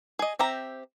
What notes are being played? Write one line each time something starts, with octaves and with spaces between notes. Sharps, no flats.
G#4 D#5
C4 G4 E5 A#5